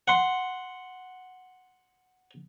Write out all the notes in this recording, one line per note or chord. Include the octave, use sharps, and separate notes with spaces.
F#5 C6